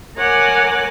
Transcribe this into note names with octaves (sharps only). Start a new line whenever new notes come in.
A#4 C#5 F#5 G#5 D6